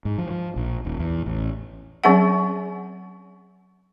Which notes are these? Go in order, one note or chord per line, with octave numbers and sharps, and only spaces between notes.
G#2
F3
F3
A#1
D#1
E2
A1
F#3 C4 C#4 G#4 E5 F#5